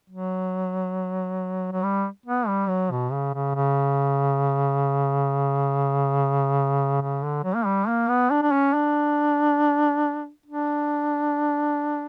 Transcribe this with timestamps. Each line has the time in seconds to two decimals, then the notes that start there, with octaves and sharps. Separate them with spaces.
0.10 F#3
1.72 F#3
1.83 G3
2.26 B3
2.47 G3
2.69 F#3
2.91 B2
3.12 C#3
3.34 C#3
3.55 C#3
7.01 C#3
7.23 D3
7.44 F#3
7.55 A#3
7.66 G3
7.88 A#3
8.08 B3
8.31 D4
8.42 D4
8.52 C#4
8.74 D4
10.46 D4